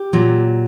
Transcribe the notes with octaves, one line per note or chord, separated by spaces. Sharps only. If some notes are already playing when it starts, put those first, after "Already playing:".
Already playing: G4
A#2 F#3